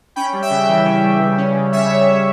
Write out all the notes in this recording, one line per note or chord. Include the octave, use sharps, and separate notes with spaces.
C#4 G5 B5
G3
E5 G5
C#3
E3
C#4
G3
C#3
C#4
C#3
G3 C#5 E5
C#3
C#4